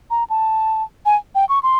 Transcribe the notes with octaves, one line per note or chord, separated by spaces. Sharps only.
A#5
A5
G#5
G5
C#6
C6